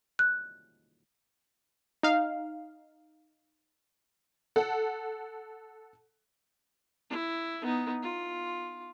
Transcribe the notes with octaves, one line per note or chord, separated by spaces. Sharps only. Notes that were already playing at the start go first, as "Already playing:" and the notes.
F#6
D#4 F5
A4 F#5
E4
B3 D#4
F4